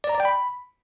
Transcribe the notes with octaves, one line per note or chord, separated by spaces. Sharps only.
D5
A#5
D5
G5
B5